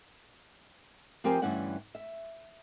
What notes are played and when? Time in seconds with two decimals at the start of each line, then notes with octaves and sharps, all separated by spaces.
1.24 F3 C4 G4 A#4 C5 G#5
1.42 D2 G2 E3 G3 C#4 F#5
1.95 E5